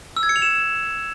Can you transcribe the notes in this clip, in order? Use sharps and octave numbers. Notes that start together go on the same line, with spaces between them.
E6
G#6
C#7
F7
E7